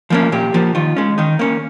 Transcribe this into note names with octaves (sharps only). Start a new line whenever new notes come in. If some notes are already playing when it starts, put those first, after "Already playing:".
F3 A#3 C#4
A#2 G4
F3 A#3
D#3 F4
G#3 C#4
D#3 D#4
A#3 C#4